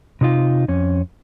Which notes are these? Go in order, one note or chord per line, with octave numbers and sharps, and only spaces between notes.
C3 D#4 F4
F2 C#4